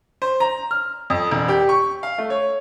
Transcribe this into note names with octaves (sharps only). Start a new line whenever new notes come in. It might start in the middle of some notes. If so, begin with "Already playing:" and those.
C5
A#5
F6
F2
E1
G4
C#6
F5
A3
C#5